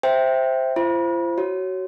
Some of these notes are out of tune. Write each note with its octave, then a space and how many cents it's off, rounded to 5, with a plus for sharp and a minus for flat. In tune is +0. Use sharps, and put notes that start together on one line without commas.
C5 +0 E5 +0 G5 +0
F4 -40 C5 +0 B5 -40
F#4 +25 C#5 +0